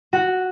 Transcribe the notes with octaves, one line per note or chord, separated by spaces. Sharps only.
F#4